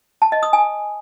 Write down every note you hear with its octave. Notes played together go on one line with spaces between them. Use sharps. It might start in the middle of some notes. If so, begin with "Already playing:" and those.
A5
D#5
D#6
G#5